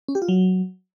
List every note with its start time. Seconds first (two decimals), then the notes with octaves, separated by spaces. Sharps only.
0.08 C#4
0.15 G4
0.22 F4
0.28 F#3